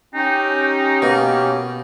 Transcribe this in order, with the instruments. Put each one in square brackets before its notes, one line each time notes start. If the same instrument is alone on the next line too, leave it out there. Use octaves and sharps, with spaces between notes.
[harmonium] C#4 G4 [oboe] D#4 [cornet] G5
[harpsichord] B2 [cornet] A#3